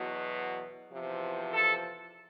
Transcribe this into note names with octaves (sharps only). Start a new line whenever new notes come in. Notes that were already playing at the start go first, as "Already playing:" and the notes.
Already playing: E2 B2 F#3
E2 C3 F3
A4